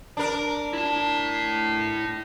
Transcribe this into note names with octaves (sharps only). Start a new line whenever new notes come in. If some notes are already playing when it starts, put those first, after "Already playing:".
D4 A#4
E4 A5